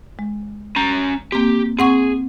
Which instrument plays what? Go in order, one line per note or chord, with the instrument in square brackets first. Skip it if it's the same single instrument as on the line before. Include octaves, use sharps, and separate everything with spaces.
[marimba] G#3
[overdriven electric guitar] C#4 A#5
[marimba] A#3 C4 [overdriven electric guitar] G4
[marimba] C4 F#5 C#6 [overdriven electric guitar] G#4